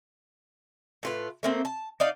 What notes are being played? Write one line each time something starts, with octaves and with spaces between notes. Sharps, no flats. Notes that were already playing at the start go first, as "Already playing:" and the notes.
A2 F4 B4
A3 A#3 C4
A5
D#4 D5 F5